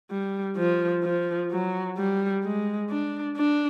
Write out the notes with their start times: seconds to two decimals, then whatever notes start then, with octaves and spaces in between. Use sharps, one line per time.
0.10 G3
0.57 F3
1.03 F3
1.51 F#3
1.98 G3
2.44 G#3
2.90 D4
3.37 D4